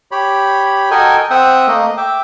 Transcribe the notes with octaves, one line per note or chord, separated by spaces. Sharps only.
G4 C#5 B5
F#4 A4 A#4 D#5 G5 G#5
C4 E5 F#5 G5 D#6
A3 A#3 D#5
E5 G5 D6